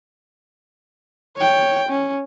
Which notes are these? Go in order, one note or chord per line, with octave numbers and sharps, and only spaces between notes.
C#5 G5
C#4